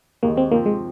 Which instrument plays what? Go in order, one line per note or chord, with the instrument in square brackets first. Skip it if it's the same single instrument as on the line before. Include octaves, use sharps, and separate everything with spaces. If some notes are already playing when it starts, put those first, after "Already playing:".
[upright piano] D#2 D#3 G#3 D#4 [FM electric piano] A#3
[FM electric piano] C4
[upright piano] C3 F3 C4 [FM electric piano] A#3
[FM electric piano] G#3